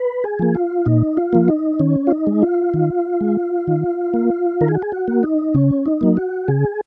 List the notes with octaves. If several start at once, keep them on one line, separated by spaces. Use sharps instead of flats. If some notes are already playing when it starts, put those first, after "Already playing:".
Already playing: B4
G#4
F3 A#3
F4
A#2 D#4
F4
F3 A#3
D#4
D#3 C#4
F4
D#4
G#3
F4
D#3
G#3
D#3
A#3
D#3 A#4
G#4
F#4
G#4
F#4
A#3
D#4
C#3 C#4
D#4
F#3 A#3
F#4
C#3 G#4